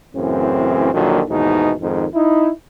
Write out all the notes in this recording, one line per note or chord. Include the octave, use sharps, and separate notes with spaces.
F#2 A2 C#3 E3 C4
A#1 A#2 D3 D#3 F#3
D#2 G#2 B2 E3 D#4
F2 G#2 D#3
D#4 E4